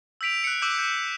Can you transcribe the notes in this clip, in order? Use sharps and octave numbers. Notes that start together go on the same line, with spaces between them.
E6 G6 B6 D7 F7
F#6 C#7
D6 E6 G6
G6